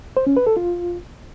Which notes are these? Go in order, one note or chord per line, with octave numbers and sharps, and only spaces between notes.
C5
C#4
B4
A4
F4